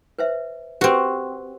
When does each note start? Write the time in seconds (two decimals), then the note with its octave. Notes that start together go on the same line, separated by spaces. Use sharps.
0.19 B4 C5 E5
0.81 C4 F#4 G4 B4